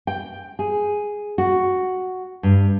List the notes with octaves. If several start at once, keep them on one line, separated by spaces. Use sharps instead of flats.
G5
G#4
F#4
G2